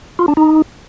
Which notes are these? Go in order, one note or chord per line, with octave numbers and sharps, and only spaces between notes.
F4
D4
D#4